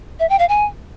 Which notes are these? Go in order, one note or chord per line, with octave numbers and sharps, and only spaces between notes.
E5
G5
F5
G#5